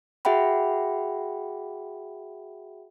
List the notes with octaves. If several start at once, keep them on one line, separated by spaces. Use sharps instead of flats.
F#4 G#4 E5 F#5 G5 B5